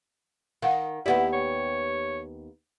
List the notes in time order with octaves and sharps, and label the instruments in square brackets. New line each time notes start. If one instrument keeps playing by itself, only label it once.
[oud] D#3 [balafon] F5 F#5
[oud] D#2 B3 G4 [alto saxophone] E4 [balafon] D5 F#5
[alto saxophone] C#5